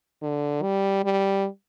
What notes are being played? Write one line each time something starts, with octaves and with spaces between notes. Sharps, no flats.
D3
G3
G3